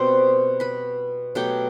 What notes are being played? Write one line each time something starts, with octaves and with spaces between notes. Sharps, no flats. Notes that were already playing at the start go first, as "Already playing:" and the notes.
Already playing: B2 G3 C4 C5 C6
B4 B5
B2 F#3 A3 G4 G5